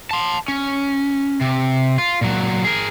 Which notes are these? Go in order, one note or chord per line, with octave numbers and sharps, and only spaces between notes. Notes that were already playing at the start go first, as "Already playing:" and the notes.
A5 C6
C#4
C3
F4
A#2 F#3
G#4 A#4